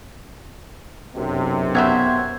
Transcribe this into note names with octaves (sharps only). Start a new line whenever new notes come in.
B1 F#2 C3
B3 C5 E5 F#5 G#6